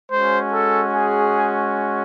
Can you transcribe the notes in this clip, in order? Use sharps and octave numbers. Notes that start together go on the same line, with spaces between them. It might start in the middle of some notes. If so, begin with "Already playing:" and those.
G#3 C#4 F#4 C5
A4
G#4